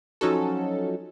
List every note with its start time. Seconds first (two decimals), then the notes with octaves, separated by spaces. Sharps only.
0.21 F3 F#3 C#4 D#4 F#4 A4